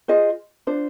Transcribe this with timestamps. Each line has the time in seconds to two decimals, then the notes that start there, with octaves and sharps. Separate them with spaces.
0.08 F4 G#4 C5 D#5
0.67 D4 F4 C5